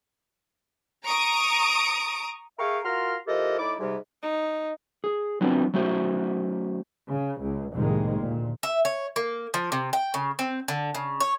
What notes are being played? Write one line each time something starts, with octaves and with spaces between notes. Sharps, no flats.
A#5 C#6 D#6 D7
G#4 A#4 E5 F5 G5 C#6
F4 F#4 A#4 A#5 C6 F6
F3 E4 G4 A4 A#4 D#5
A2 D#4 E4 D5 D6
G#2 C3 G3
D#4
G#4
F#3 B3 C4 D4 F4
F#3 A3 C#4 F#4 C5
C#3
C#2
F1 C2 A2 D#3 G#3 A#3
D2 A#2
E5
C#5
A#3
F3
C3
G5
C#3
C4
D3
C#3
C#5